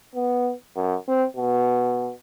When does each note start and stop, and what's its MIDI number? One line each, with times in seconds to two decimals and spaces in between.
0.15 0.53 59
0.76 0.96 42
1.08 1.26 60
1.37 2.12 47